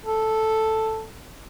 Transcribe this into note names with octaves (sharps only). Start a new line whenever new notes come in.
A4